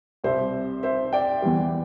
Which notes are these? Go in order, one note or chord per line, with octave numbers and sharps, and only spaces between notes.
C2 C3 G3 C5 E5
C5 E5
D5 G5
E2 E3 G3